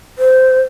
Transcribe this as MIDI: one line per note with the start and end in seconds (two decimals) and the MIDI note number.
0.19 0.60 72